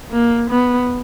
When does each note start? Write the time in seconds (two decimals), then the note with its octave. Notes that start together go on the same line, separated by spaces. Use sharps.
0.11 A#3
0.50 B3